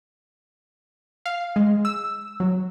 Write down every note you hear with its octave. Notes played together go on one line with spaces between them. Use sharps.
F5
G#3
E6
F#3